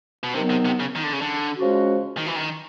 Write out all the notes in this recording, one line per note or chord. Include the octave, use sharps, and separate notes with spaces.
B2
C3 D#3 F#3 B3
C3
C3
C#3
D#3
D3
C#3
D3
C#3 F3 G#3 C#4 F#4
D#3
E3
D#3